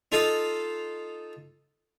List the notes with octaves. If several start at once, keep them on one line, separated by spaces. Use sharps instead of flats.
D#4 F4 A4 D#5 F5